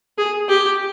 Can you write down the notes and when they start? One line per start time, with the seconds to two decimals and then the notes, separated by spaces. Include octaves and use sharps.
0.18 G#4
0.49 G4